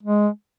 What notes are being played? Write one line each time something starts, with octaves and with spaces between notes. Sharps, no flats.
G#3